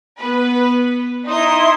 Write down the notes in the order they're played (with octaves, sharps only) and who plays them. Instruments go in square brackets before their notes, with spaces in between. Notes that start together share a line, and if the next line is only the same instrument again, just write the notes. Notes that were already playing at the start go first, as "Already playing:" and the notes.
[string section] B3 B4
[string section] D#4 [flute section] E4 C6 D#6